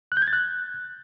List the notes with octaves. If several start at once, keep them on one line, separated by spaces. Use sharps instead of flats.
F#6
G6
G#6
A6
F#6